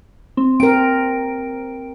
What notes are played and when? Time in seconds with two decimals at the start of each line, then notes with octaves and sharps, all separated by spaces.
0.37 C4
0.60 C4 A#4 D7